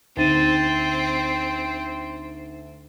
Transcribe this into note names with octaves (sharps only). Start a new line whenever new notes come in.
D2 C4 D#4 A6 D#7